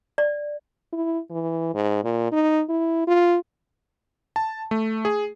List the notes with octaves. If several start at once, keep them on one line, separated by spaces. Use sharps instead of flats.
D5
E4
E3
G#2
A#2
D#4
E4
F4
A5
A3
G#4